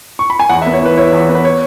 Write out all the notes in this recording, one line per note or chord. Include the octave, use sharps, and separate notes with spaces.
C#6
B5
G#5
E2 F#5
E5
B3
C#5
E3 B4
E4 C#5
E2
B3
B4
C#5